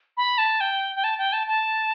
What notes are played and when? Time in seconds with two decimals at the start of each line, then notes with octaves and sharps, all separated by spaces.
0.17 B5
0.38 A5
0.61 G5
0.96 G5
1.04 A5
1.18 G5
1.33 A5
1.47 A5